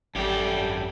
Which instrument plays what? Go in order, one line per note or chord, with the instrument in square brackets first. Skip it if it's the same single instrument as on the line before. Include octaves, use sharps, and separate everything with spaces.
[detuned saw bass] G#1 [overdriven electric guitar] F#2 G4 [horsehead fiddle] G3 [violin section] A4